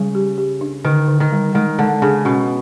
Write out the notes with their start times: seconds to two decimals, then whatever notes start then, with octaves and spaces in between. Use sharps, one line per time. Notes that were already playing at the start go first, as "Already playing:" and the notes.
Already playing: C#3 G3
0.15 G4
0.38 G4
0.61 D4
0.84 D3 D#3
1.08 D3
1.20 D#3
1.32 G3
1.55 D#3 G#3
1.79 D3 G#3
2.02 C#3 D4
2.25 B2 C#4